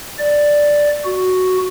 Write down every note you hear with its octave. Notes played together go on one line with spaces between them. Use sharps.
D5
F#4